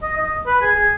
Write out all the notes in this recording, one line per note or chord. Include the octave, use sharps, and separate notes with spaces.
D#5
D#5
B4
G#4
G#4